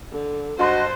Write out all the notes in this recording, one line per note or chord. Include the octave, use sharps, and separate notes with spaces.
D3
G2 F#4 C5 D#5 C6 F#6